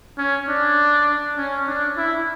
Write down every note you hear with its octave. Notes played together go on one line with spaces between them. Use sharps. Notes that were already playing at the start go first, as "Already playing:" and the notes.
C#4
D4
C#4
D4
E4